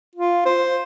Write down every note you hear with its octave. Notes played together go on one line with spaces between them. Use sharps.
F4
C5